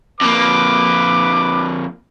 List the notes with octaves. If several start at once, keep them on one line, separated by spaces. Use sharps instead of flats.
F2 A#3 B4 D6